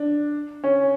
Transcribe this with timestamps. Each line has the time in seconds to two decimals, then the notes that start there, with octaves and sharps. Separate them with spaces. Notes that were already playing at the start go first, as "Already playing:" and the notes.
Already playing: D4
0.64 C#4